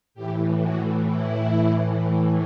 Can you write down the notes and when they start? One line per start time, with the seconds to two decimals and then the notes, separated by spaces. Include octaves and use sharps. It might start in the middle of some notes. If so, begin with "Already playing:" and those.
0.14 A2 E3 G4
0.61 F#4
1.05 E4